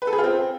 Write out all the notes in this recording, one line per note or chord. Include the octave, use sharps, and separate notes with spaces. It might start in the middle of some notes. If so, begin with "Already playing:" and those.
B4
A4
G#4
F4
C4